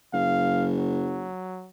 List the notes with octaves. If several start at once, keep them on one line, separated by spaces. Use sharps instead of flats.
F#1 F5
F#3